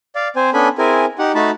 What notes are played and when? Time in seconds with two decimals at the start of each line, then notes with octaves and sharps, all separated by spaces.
0.15 D5 F5
0.36 C4 C5 G#5
0.54 B3 C#4 D4 A4 G#5 B5
0.78 C4 E4 G#4 A#4 G#5
1.19 D#4 G4 F#5
1.35 A3 D#4 F#4 A5 B5